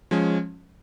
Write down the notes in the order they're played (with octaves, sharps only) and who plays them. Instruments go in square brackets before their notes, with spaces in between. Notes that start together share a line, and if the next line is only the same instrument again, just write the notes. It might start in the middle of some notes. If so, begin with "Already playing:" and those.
[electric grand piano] F3 G#3 C#4